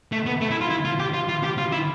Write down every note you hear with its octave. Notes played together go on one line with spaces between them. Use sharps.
A3
B3
A3
E4
F4
E4
F4
G4
F4
F4
G4
F4
E4